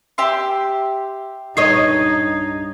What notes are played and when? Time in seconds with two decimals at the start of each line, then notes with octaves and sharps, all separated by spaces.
0.18 G4 E5 C6
1.57 G2 D#4 C#5 D#5 G#6 C7